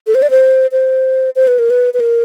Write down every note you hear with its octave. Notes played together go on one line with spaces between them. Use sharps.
A4
C5
D5
C5
C5
C5
B4
A#4
B4
B4
A#4